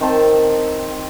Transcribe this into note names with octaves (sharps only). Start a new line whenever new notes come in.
D#3 C4 A5